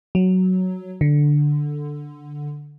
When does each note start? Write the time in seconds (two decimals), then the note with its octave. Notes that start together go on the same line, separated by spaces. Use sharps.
0.15 F#3
1.01 D3